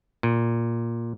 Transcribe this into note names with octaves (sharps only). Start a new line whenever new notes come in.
A#2